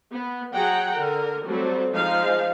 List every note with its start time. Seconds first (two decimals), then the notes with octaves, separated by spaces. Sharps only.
0.13 B3
0.54 F#3 G#4 F#5 G5 A#5
0.95 D3 A#4
1.45 F#3 G3 A3 C4 A4
1.93 F3 G#3 D#4 F5